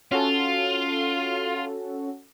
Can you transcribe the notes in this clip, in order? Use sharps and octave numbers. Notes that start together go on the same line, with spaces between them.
C#4 F4 F#4 A4